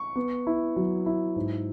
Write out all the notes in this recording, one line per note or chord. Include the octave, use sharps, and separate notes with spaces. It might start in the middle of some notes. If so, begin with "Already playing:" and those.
Already playing: C#6
B3
E4
F#3
E4
G#2